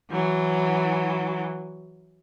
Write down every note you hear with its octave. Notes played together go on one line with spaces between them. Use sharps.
E3 F#3